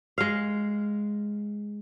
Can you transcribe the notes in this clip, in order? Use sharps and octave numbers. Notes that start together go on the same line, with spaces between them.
G#3 F5